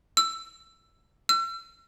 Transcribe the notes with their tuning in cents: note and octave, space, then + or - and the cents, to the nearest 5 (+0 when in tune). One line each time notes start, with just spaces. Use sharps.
E6 +15
E6 +40